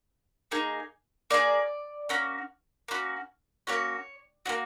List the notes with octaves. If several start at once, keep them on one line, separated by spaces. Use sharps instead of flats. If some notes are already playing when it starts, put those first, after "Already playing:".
A#3 D#4 G#4
A#3 D#4 G#4 D5
A#3 C#4 F#4
A#3 C#4 F#4
A#3 C#4 F#4 C#5
A#3 C#4 F#4